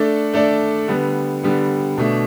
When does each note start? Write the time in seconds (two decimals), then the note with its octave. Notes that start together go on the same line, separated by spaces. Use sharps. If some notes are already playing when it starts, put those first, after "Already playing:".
Already playing: A3 D4 A4 D5
0.33 A3 D4 A4 D5
0.88 D3 G3 B3
1.43 D3 G3 B3
1.98 B2 A3 D4